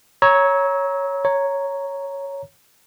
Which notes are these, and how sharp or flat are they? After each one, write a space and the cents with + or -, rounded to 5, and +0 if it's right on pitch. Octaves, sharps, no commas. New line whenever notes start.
C#5 +0 A#5 +20 E6 -30
C#5 +0 A#5 +0